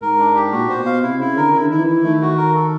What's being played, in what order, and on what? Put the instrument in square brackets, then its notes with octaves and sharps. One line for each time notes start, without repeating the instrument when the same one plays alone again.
[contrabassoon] G#2 [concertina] A#4
[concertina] D4
G4
[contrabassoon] A#2 [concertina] F#4
[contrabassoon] A#2 [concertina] C5
[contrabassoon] B2
[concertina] F5
[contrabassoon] C3 [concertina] E4
[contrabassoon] C#3 [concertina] E4
[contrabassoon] D3 [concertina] A#4
[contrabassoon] C#3 [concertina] E4
[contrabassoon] D3
[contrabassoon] D#3 [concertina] E4
[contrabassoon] E3
[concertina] E4
[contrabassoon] D#3 [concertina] A3
[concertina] F#4
A#4
A4